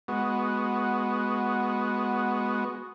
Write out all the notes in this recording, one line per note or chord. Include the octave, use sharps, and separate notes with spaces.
G#3 B3 F#4